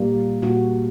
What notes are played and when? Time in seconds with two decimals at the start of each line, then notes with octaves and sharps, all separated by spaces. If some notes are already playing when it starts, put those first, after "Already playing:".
Already playing: A#2 G3 A#3
0.42 A#2 G3 A#3 F#4